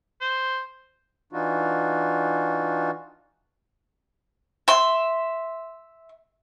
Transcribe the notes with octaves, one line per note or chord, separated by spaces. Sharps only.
C5
E3 D4 D#4 F4 F#4
E5 C6